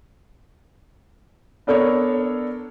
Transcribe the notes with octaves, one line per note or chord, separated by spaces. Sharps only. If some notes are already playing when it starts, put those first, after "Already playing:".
B3 D4 A4 A#4 C#5